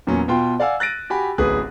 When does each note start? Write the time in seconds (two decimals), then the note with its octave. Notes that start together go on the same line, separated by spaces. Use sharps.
0.07 E2 A#2 F#3 C#4
0.28 B2 F4 G5 C6
0.60 D5 F5 F#5 G#5 E6
0.80 F#6 A6 A#6 D7 D#7
1.10 F#4 G4 G#5 B5
1.38 D1 A1 G#4 B4 D#6 F#6